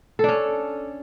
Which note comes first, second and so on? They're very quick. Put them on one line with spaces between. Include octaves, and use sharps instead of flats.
A4 D4 C#4